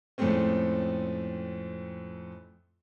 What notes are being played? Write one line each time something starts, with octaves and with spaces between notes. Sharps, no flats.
F2 A2 G#3 A3 C4 C#4